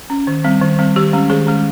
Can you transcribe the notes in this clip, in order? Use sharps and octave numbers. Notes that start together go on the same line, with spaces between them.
C#4
D#3
G3 C4
D#3
G3 C4
D#3 G4
G#3 C#4
D#3 G#4
G#3 C#4